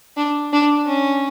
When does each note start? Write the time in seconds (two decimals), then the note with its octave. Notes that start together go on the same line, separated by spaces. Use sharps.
0.17 D4
0.53 D4
0.87 C#4